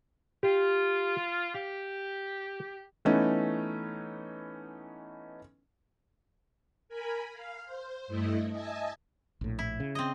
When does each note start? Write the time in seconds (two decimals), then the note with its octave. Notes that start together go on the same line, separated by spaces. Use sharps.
0.43 F4 G4
1.54 G4 F5
3.05 E3 A3 B3 C#4 D#4
6.88 A#4 G#5 B5
7.33 F5
7.65 C5
8.07 G2 A3 E4 D#5
8.51 D#5 E5 G#5 A5
9.41 A#1 A2
9.59 E4
9.80 C#3
9.95 C4 D#5